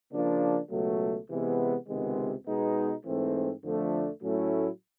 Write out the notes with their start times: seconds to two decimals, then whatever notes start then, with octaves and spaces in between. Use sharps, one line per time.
0.12 C#3 F3 A#3 D4
0.71 C#2 B2 F#3 A3
1.30 C3 E3 G#3 B3
1.88 C#2 C3 D#3 G#3 B3
2.47 B2 G#3 B3 D#4
3.05 G#2 E3 A3 C4
3.63 F2 D3 F3 A3 D4
4.21 A2 F#3 A3 C#4 E4